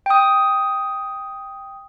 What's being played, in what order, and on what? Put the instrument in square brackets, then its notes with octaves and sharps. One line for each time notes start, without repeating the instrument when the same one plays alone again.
[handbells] G5 D#6